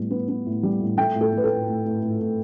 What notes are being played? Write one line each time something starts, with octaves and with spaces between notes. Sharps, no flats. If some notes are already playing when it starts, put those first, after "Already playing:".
Already playing: A2 G3 B3
B3
B3
A2
G3
A2
A3 G5
A2
A4
A2 B4
A4
A2
A2
A2
A2
A2